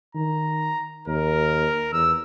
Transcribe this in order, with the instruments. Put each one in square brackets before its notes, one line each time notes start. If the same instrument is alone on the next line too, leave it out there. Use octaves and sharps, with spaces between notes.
[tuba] D#3 [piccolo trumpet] A#5
[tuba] D#2 [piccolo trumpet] A#4
[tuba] E2 [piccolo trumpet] E6